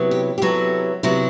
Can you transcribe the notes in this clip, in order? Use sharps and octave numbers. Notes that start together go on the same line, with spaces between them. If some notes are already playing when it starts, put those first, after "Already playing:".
Already playing: C3 F#3 B3 E4
G4
G4
C3 F#3 B3 E4 A4
C3 F#3 B3 E4